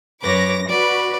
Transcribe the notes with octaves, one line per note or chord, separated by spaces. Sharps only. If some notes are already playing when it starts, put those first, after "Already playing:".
F#2 B4 C#5 D6 A#6
F#4 B4 D5